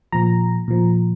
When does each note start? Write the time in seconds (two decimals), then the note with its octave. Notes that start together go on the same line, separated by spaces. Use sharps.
0.12 A#2 F3 A#5
0.68 A#2 F3